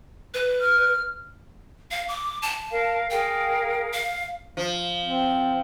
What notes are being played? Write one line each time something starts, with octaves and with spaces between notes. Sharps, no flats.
B4
F6
F5
D6
A5
A#4 F5
G#4 A#4 F5 G5
F5
F3
C4